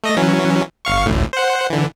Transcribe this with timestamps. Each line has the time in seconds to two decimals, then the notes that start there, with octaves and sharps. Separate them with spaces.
0.04 A3 D#5 A#6
0.17 E3 F#3 C#4
0.85 G1 F5 C#6
1.06 A1 D2 A2
1.33 C5 F#5
1.70 D3 E3